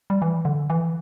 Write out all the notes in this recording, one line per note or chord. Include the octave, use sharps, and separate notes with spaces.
G3
E3
D3
E3